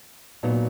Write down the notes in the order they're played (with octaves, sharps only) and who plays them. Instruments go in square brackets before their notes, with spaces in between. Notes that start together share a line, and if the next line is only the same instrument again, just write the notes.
[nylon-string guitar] A#2 F#3 B3 D#4